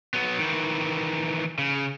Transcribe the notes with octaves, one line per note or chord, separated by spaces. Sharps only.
F#3 B3
D#3 E3
C#3